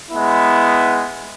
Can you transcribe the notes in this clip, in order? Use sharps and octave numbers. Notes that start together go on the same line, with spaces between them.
G#3 B3 E4